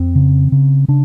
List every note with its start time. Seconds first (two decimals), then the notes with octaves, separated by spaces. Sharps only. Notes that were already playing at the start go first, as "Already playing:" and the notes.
Already playing: F2 C4
0.15 C#3
0.52 C#3
0.88 C#3 D4